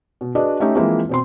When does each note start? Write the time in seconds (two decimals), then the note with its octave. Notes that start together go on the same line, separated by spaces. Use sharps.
0.21 B2
0.35 D4 F#4 G#4 B4 D5 D#5
0.60 A3 C#4 D#4 G4 E5
0.75 E3 F3 G#3 A#3 C4 E4
1.09 B2 C4 C6